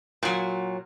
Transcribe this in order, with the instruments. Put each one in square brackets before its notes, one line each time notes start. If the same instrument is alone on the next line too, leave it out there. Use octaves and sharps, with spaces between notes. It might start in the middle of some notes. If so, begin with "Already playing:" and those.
[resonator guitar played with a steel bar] A#2 F#3